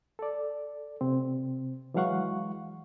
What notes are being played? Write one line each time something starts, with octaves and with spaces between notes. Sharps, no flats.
A4 D5
C3 C4
E3 F#3 G#3 F5 F#5 C#6